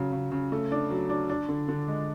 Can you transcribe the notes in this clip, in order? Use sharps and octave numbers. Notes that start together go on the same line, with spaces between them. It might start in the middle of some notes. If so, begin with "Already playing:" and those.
Already playing: C#3 F#3
C#3
C#3
A3
D4
F#3
D4
D4
D3
D3
G#3